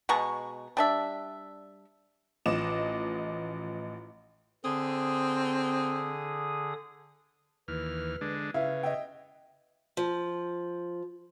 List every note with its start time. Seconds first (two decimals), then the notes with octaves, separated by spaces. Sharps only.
0.09 B2 G#3 A#5 C#6
0.77 G3 D4 E5
2.46 A1 F3 D#5 D6 E7
4.64 D3 C4 G#4 D#6
7.68 D#2 E3 B4 F6
8.21 D3 G#3 D4
8.54 C#3 E4 B4 E5 F5
8.83 D#5 E5 G5
9.97 F3